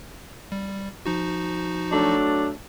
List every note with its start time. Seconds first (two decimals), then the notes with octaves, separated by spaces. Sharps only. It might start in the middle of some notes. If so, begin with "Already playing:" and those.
0.52 G3
1.06 F3 D#4 F#4
1.91 F#3 A3 D4